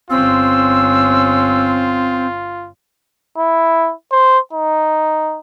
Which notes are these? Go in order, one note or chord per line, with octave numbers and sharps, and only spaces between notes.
G1 C4 C#4 F4 E6
E4
C5
D#4